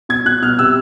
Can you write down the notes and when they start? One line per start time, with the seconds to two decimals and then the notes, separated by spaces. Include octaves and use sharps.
0.09 B2 G#6
0.25 B2 F#6
0.42 B2 F6
0.59 C3 E6